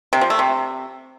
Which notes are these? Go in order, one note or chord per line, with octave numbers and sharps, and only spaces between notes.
C3
F3
A3
C3